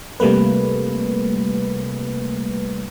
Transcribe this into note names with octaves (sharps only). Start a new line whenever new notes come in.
C3 G3 A3 A#3 B4